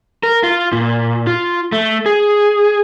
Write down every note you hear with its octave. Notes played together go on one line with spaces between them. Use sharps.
A#4
F4
A#2
F4
A3
G#4